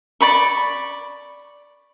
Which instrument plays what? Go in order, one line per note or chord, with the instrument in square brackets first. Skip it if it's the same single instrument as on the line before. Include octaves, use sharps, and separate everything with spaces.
[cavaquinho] D5 B5 C#6